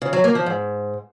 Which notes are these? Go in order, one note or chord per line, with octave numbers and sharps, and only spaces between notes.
C#3
F#3
A#3
F3
G#2